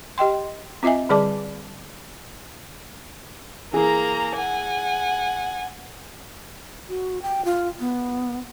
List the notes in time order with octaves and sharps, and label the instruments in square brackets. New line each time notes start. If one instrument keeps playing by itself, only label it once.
[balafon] G4 D#5 G5 C6
C4 F4 D#5 E5 G#5
D3 G3 G#4 D5 A5 D6
[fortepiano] E3 G#4 [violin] A#3 A#5
[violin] F#5 G#5
[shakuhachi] F#4
G5
F4
B3